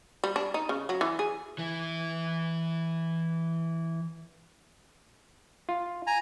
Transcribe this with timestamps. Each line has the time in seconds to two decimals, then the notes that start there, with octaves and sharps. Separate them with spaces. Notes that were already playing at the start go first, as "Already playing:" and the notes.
0.24 G3
0.36 D4
0.54 D#4
0.69 C#3
0.89 F#3
1.01 E3
1.19 G#4
1.58 E3 E4
5.69 F4
6.07 G#5 A#5